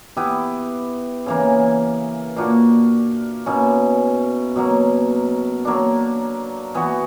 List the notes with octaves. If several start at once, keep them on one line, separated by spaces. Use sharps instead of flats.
B3 E4 G4 B4
C#3 E3 A#3
A#2 A#3 D4 F#4
B2 A#3 C#4 E4
B2 F#3 A#3
F#3 A#3 D4
E3 B3 F#4